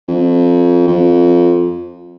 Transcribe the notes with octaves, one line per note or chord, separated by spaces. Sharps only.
F2
F2